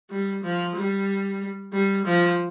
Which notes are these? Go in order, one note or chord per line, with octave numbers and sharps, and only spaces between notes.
G3
F3
G3
G3
F3